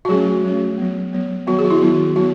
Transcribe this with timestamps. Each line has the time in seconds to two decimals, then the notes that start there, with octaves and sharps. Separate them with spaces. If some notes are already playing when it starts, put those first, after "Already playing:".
0.05 F#4
0.09 F#3 A3 C#4 G#4
0.44 F#3 A3 C#4
0.78 F#3 B3
1.13 F#3 B3
1.47 D#3 F#3 B3 F#4
1.59 G#4
1.64 F#4
1.71 E4
1.81 D#3 F#3 B3 E4
2.16 F#3 B3 F#4